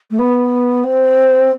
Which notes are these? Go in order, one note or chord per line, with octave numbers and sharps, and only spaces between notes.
A3
B3
C4